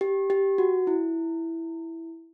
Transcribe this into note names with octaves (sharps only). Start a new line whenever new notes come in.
G4
G4
F#4
E4